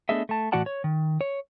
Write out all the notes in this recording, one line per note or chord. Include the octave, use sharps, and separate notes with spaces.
A3 B3 D4 G#4 D#5 E5
A3 A5
A2 E3 F#4 D5 F#5 A5
C#5
D#3
C#5